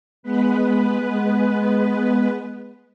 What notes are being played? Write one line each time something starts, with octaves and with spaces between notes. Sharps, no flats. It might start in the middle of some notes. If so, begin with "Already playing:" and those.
G#3 B3 B4